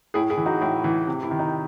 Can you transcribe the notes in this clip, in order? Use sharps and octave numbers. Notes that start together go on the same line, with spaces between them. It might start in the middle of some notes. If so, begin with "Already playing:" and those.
A2 E4 G#4
E4 G#4
E3
D#4 F#4
A2 E4
E3
C3
E4
D#3
D#4